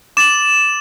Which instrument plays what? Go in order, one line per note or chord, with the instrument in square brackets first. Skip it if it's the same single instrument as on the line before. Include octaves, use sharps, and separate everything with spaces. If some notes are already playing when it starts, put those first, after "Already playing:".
[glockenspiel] D6 A6 F#7 [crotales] E7